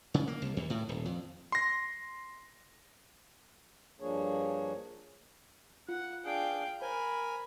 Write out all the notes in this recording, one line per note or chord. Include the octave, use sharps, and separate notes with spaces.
C#3
A#3
C2
D#2
A2
D#1
F2
C6 A#6
G2 F3 A#3 D4 G#4 C#5
F4 F#5
D4 G#4 F5 G5
A#4 C5 G#5 B5